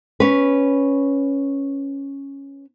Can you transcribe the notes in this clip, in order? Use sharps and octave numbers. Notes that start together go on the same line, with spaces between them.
C#4 B4